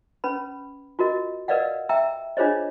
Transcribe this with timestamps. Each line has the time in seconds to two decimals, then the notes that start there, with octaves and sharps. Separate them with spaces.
0.24 C#4 B4 B5
0.99 F4 F#4 A#4 D#5
1.48 A#4 B4 D5 D#5 F5 F#5
1.89 E5 G5 A#5 E6
2.37 D4 F4 G#4 C5 C#5 D#5